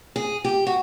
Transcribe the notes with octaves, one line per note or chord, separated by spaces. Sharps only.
G#4
G4
F#4